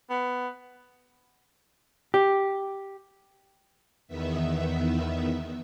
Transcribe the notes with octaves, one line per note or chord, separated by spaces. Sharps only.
B3
G4
E2 D#3 B3 E5